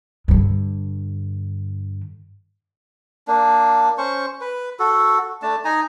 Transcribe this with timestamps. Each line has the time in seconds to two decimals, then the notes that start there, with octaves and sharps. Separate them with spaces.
0.28 G2 D3
3.28 A#3 D4
3.98 C#4 C5 C#6
4.41 B4
4.79 F#4 A4
5.42 A3 D4 A5
5.65 D#4 G#5 A#5